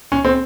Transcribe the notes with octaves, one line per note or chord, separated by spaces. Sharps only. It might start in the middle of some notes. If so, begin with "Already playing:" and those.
C#4
C4